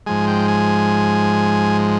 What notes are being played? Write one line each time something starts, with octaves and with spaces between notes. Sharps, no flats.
G#2 F3 G#3 G#5
G5
G#5